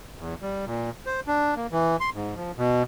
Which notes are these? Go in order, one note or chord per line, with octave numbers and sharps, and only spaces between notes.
E2
G3
A#2
C5
D4
A#3
E3
C6
G#2
F3
B2